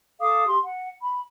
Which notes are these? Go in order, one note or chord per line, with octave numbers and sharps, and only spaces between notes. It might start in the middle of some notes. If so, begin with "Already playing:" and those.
A4 F5 D6 D#6
G4 C6
F#5
B5